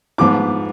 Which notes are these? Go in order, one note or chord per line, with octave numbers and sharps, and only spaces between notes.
G#2 F3 B3 F4 D6